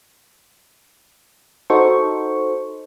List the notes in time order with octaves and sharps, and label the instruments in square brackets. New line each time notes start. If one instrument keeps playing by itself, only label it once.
[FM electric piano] D#4 F#4 A4 C5 C#6